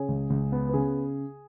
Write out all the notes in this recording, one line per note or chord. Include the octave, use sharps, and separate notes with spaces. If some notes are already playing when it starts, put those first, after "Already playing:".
Already playing: C#3 G#4 C#5
C#2
C#2
B3
B4
C#3 G#4